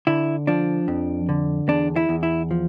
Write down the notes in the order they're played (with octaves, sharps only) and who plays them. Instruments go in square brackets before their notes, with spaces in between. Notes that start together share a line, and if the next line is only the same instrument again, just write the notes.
[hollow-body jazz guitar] D3 E4
F3 D4
F2
D3
E2 D4
E4
E2
E4
F3